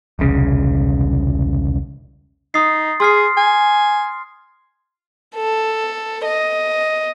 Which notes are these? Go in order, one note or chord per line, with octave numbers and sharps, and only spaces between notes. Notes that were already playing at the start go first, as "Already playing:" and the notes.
E1 C2 C#3
D#4 D#6 A6 C7
G#4 C6 F6 C7
G#5
A4
D#5